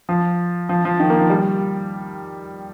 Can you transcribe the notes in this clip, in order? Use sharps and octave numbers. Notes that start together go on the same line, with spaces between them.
F3
F3
F3
D#3
A#3
F3
G3